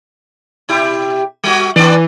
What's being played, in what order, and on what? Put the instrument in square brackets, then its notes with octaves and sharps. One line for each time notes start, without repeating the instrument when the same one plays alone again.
[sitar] B2 E4 G4
G3 F#4
[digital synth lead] E3 [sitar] B3 D4 D5